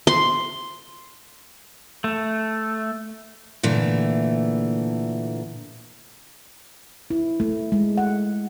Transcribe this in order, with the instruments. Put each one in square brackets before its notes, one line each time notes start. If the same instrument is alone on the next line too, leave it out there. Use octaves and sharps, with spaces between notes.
[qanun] C6
[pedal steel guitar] A3
[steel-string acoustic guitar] A#2 D3 E3 A3
[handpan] E4
A3
G#3
F#5